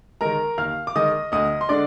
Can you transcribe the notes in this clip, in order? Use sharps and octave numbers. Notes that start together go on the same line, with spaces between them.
D#3 G#3 A#4 A#5
D#2 F5 F6
D6
D#3 G#3 D#5 D#6
D2 D#5 D#6
C6
D3 G#3 D4 D5 D6